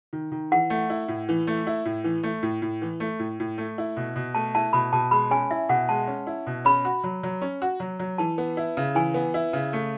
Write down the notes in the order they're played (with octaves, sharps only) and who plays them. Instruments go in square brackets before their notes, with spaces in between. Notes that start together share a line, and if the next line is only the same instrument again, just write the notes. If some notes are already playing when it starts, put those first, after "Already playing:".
[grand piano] D#3
D#3
[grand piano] E3 [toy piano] F#5
[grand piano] A3
E4
A2
E3
A3
E4
A2
E3
A3
A2
A2
E3
A3
A2
A2
A3
E4
B2
B2
[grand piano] A3 [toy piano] A5
[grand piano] E4 [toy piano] A5
[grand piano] B2 [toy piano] B5
[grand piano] B2 [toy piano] A5
[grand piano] G#3 [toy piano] B5
[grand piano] C#4 [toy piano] G#5
[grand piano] E4 [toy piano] E5
[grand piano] B2 [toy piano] F#5
[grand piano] G#3 [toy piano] A5
[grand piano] C#4
E4
B2
[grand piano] C#4 [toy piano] B5
[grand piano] F#4
F#3
F#3
C#4
F#4
F#3
F#3
[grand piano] E3 [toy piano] A5
[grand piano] B3
E4
C#3
[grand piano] E3 [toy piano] G#5
[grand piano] B3
E4
C#3
A3